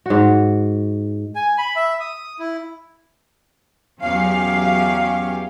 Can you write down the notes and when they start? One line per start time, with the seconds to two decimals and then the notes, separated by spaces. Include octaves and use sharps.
0.06 G#2 F#4
1.35 G#5
1.58 B5
1.76 E5
2.00 D#6
2.39 E4
4.01 E2 F#3 C#4 G4 F5